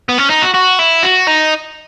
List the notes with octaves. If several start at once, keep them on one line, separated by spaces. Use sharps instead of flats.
B3
C#4
D#4
F#4
F#4
E4
F#4
D#4